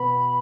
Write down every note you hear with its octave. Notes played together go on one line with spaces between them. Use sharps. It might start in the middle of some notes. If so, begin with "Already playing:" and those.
Already playing: B2 B3 B5